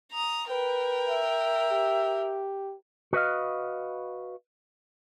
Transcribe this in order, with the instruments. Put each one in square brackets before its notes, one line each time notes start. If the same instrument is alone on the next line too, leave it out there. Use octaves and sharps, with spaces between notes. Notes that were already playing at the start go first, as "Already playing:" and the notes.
[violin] A#5 D#6
[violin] A#4 G5 [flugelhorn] B4
[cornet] E5
[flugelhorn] G4
[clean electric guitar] F#4 B4 D#5 F5